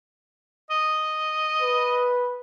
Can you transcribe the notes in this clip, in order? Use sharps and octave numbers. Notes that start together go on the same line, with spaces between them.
D#5
B4